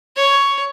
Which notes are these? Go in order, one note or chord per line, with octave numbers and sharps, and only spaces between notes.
C#5